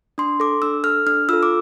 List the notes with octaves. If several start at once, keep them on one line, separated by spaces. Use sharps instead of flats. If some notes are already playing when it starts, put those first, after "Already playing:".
D4 C6
A4 D6
D4 E6
A4 F6
D4 F6
F4 A4 E6
D6